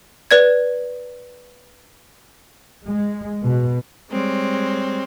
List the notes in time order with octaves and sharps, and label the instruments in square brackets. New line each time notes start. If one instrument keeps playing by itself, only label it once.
[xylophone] B4 D5 G#6
[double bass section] G#3
B2
[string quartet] G3 G#3 C4 C#5